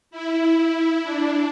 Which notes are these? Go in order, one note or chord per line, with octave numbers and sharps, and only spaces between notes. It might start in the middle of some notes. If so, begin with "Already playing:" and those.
E4
D4